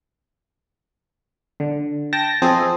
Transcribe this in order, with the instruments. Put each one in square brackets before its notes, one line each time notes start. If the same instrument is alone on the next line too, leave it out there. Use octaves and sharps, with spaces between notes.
[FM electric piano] D3
G5 A5 A#6
F3 C4 G#4 A4 D#5